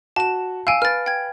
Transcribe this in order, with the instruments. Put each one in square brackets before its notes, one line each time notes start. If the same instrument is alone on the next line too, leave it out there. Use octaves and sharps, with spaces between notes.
[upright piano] F#4 [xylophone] A5 E7
[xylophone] F5 G#5 [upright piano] E6 D7
[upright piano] B4 [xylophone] F6 A6
[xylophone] G5 G#6